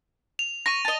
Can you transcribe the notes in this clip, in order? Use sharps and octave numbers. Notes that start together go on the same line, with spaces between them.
F7
C#6 A#6 D#7
D#5 A5